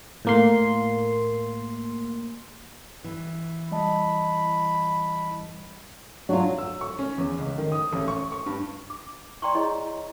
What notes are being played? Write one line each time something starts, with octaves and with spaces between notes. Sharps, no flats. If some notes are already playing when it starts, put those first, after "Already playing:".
A2 A#3 C6
E3
G3 D#5 A5 B5
F#3 D4 F4
E6
C#6
C#4
E2
C#2
D#3
D#6
A1
C#6
C#6
G2
D6
D5 G5 A#5 C6 C#6
E4 G#4 C#5 D#5